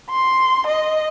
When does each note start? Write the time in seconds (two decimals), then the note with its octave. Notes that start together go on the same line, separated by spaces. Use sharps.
0.10 C6
0.67 D#5